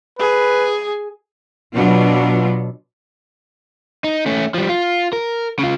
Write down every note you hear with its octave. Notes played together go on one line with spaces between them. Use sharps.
G#4 B4
B2 F#3 B3 D4 F4
D#4
A3 C#4
F3 G3
F4
A#4
C#3 F4